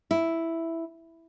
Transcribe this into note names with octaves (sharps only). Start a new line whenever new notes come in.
E4